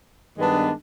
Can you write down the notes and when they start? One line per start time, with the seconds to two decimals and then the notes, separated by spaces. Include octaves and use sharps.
0.37 G2 D#3 G#3 B3 D4